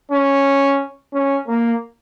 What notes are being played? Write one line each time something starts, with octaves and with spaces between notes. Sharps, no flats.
C#4
C#4
A#3